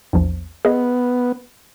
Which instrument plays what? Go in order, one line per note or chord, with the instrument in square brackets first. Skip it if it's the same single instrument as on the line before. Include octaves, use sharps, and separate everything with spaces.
[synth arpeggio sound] A#1 E2 F3
[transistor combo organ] B3 [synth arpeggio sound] G#4 D#5